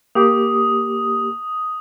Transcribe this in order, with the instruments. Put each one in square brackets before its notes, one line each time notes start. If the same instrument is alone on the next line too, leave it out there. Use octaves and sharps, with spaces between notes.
[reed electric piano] A#3 G4 D6 [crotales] D#6